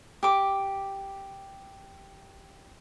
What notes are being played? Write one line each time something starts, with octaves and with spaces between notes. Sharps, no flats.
G4 D6